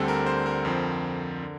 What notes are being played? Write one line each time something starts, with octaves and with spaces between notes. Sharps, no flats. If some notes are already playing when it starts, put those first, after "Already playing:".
Already playing: D2 D3 G3 C4 A4
A#4
C5
A#4
F2 D3 F3 C4
D3